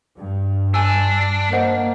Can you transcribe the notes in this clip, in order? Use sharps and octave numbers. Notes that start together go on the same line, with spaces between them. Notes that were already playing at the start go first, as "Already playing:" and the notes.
G2
D4 G#5 E6
A#3 C5 D#5 F#5